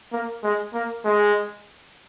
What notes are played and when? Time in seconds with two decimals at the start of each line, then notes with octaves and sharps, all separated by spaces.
0.12 A#3
0.43 G#3
0.74 A#3
1.05 G#3